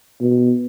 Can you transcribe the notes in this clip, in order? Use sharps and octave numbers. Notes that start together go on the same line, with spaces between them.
B2